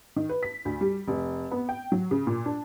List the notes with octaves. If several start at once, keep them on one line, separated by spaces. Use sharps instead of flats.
D#3
B4
B6
D2
G3
F1
B3
G5
F#3
C#3
A#2
D4